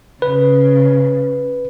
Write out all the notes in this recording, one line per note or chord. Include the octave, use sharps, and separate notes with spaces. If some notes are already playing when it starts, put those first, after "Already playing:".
C#3 B4